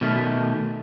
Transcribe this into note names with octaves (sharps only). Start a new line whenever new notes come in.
B2 D#3 A3